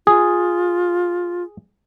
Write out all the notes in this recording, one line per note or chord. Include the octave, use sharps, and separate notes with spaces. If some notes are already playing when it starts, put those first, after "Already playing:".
F4 G#4